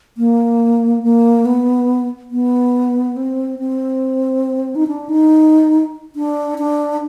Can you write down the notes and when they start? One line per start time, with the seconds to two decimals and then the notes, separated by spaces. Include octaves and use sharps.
0.17 A#3
1.03 A#3
1.45 B3
2.31 B3
3.16 C4
3.59 C4
4.75 D#4
4.87 D4
5.09 D#4
6.16 D4
6.58 D4